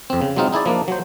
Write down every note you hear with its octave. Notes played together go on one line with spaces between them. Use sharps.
F2 C4
C#3
F#3 G#3 C4 D#4 F4
D#4 E4 G#4 D5
F3 A#3 D4
F#3 C5